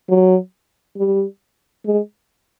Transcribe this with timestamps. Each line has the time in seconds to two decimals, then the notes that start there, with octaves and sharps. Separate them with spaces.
0.09 F#3
0.97 G3
1.86 G#3